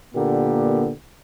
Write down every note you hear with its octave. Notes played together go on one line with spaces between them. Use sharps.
A#2 D3 A#3 B3 G4